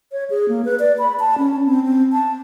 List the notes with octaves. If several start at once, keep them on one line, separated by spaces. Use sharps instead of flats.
C#5
G#4
A#3
B4
D5
B5
A5
C#4
C4
C4
A5